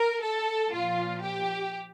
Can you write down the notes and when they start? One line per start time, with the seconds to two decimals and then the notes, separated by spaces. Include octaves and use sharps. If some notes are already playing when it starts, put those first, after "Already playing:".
Already playing: A#4
0.23 A4
0.72 A#2 F3 F4
1.22 G4